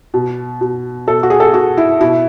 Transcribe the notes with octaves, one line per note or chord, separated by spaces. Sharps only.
B2
B2
B2 A4
F#4
G#4
A4
G#4
B2 F#4
E4
B2 E4